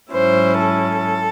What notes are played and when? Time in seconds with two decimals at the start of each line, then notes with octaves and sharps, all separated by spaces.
0.12 G#2 F#3 C#4 E4 C5
0.59 A4